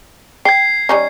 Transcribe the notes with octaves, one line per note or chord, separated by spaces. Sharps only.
G5 G#6 C7
G3 C#4 D#4